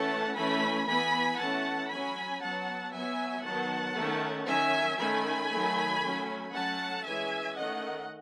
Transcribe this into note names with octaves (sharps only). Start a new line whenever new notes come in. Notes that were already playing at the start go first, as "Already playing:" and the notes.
Already playing: E3 A3 C#4 F#5 A5
E3 A3 C#4 G#5 B5
E3 B3 G#5 B5
E3 A3 C#4 F#5 A5
F#3 C#4 G#5 B5
F#3 B3 F#5 A5
F#3 B3 E5 G#5
D#3 F#3 B3 F#5 A5
D#3 A3 C#4
D#3 F#3 C#4 E5 G#5
D#3 A3 C#4 G#5 B5
D#3 F#3 A3
F#3 A3 C#4
F#3 A3 C#4 F#5 A5
E3 G#3 C#4 E5 G#5
D#3 A3 C#4 D#5 F#5